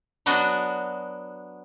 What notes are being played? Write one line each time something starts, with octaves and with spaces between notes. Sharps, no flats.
F#3 B3 D4 F#4 D#5